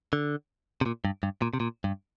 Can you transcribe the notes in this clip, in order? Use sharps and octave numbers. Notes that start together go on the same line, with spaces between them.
D3
C3
A#2
G2
G2
A#2
C3
A#2
G2